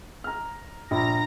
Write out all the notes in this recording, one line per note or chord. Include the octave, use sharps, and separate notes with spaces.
A#5 F6
A#1 D4 A#5 B5 A#6